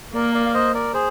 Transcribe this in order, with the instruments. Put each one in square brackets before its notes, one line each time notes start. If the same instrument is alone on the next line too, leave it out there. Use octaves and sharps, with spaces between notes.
[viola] A#3 [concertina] A#4 D5
[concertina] D5 F5
F5
C5 D#5
A#4 D5
G#4 C5